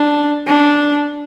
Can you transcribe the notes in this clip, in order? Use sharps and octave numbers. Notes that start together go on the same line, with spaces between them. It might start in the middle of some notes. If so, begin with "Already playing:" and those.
Already playing: D4
D4